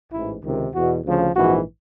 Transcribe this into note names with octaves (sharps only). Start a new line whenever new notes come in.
A1 G#2 E3 E4
C#2 C3 D#3
E2 B2 F#4
D2 C#3 F3
A#1 G#2 E3 F#4